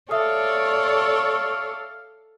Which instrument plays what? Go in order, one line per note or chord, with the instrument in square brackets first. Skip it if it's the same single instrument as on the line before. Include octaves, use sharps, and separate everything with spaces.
[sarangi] A4 [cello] C#5 D5 [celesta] E5 D#6 [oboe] F5